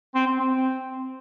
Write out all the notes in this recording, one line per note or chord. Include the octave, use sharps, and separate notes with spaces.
C4
C4
C4